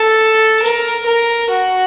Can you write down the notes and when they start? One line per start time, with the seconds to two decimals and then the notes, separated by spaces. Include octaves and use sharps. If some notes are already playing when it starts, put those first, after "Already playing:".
Already playing: A4
0.61 A#4
1.05 A#4
1.49 F#4